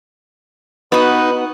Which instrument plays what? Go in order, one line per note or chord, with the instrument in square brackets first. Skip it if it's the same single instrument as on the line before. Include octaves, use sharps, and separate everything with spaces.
[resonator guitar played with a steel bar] B3 F#4 [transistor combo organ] D#4 [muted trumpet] B4